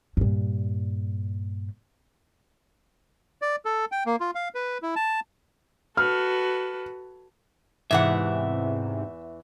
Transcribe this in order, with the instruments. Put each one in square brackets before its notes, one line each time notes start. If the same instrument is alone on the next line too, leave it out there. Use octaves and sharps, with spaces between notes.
[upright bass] G2 A#2
[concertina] D5
A4
G5
A#3
F4
F5
B4
E4
A5
[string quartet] F#4 A4 B4 [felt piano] F6
[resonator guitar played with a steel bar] E2 E3 F#5 [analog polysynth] G#2 C3 [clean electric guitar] E5